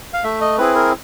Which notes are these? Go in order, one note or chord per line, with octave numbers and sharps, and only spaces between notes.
F5
A3 E5
D#5
C4 E4 G#4 B4
A#4